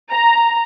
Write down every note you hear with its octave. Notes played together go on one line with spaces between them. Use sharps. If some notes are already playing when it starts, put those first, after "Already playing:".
A#5